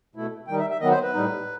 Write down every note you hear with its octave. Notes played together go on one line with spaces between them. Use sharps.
B2 A3 E4
D#3 G3 D#4 G5
E5
E5
D#3 F#3 B3 D#5
C5
B4
A2 G3 D#4